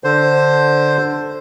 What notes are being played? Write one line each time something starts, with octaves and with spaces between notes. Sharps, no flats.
D3 C5